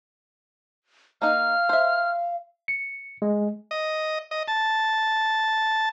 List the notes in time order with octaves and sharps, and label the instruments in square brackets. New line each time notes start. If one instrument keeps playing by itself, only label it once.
[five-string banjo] A#3 D#4 [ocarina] F5 [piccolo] F6
[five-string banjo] C5 E5
[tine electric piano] C#7
G#3
[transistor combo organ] D#5
D#5
A5